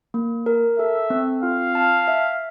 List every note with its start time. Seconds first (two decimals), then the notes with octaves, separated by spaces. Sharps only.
0.14 A#3
0.46 A#4
0.78 A4 E5
1.10 C4
1.43 F4 F5
1.75 A5
2.08 E5